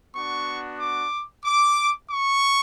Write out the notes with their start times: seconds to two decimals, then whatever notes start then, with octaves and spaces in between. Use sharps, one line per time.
0.13 B3 D4 F#4 C#6
0.78 D6
1.45 D6
2.10 C#6